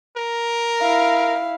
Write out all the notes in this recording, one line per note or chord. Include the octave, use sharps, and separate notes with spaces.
A#4
E4 F5